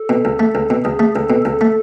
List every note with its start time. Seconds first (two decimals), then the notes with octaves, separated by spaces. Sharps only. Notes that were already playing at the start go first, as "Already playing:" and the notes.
Already playing: A4
0.09 B2
0.25 C#2
0.39 A3
0.55 C#2
0.70 B2
0.85 C#2 G#4
0.99 A3
1.15 C#2 A4
1.30 B2
1.45 C#2 A4
1.61 A3